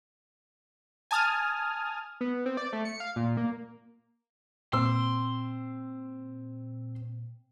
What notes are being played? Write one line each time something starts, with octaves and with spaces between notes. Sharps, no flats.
G#5 A5 D#6 F6
B3
C4
D5
A3
C#7
F5
A#2
A#3
A#2 C4 C6 E6